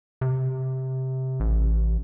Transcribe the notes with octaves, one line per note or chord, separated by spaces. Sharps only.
C3
A1